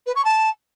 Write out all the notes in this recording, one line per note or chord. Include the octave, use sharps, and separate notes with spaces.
B4
C#6
A5